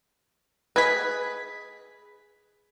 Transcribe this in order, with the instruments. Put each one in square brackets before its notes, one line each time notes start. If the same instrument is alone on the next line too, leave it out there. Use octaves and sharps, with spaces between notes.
[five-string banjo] G#4 B4 [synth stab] D#5 G#6 B6